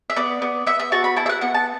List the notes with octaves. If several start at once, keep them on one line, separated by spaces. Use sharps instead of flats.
E5
B3 D5
B3
B3 E5
E5
F#4 A5
B5
E4 A5
E5
F#5
B3 F#5
A5